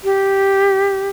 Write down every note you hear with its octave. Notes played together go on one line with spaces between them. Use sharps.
G4